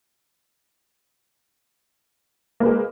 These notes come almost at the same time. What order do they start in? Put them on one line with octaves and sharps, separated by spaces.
A#3 B4 G#3